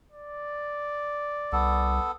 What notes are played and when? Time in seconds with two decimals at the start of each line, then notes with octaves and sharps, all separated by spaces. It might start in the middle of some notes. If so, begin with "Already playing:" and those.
0.12 D5
1.52 C2 B3 A4